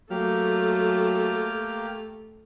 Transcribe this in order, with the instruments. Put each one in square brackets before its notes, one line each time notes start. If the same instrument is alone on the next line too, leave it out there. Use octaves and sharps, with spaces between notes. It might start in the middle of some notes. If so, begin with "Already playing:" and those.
[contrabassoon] F#3 [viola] A3 [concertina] A#3 G4 F6